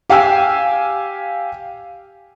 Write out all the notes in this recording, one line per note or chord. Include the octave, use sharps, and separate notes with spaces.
G4 F5 G5 G#5 E6